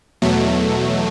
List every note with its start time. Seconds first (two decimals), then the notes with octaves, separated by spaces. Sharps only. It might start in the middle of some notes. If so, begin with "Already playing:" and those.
0.22 E2 B2 F#3 A3